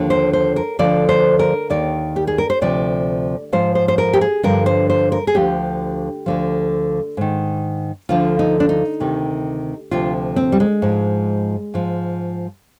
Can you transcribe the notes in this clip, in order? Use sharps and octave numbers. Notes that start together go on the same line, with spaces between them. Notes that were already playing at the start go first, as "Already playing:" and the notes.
Already playing: D#2 D3 F3
C5
C5
A#4
D2 D3 F3 D5
C5
A#4
D#2 D#3 D5
G4
G#4
A#4
C5
D2 C3 F3 D5
G#2 F3 C5
C5
C5
A#4
G4
G#4
G2 D3 F3 A#4
C5
C5
A#4
G#4
D2 D3 F3 G4
D2 D3 F3
G#2 D#3
D2 D3 F3 F4
D#4
D4
D#4
D2 C3 D#3
D2 C3 F3 F4
C4
G3
G#3
G#2 F3
G#2 F3